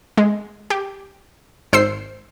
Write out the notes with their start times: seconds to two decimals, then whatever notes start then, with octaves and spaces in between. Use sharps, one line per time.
0.18 G#3
0.70 G4
1.73 G#1 C5 E6 C7